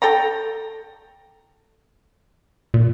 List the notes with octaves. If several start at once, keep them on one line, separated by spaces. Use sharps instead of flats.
A4 G5 A#5
A#2